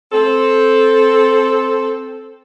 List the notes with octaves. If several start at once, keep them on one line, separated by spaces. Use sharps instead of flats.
C4 A4